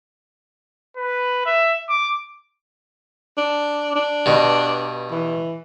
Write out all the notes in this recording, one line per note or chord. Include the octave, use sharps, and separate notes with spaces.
B4
E5
D6
D4
D4
G2 B2
E3